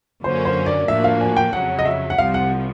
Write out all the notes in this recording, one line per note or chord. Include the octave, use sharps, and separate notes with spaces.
F#2 D3 F#3 A#3 C#4 C5
C5
D5
A2 F3 A#3 D4 F#4 E5
F5
G#5
G5
F2 C#3 F#3 F#5
D#5
E5
F#5
C2 C3 F3 F5
F#5